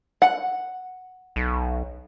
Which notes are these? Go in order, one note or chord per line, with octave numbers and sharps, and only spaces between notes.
F#5
B1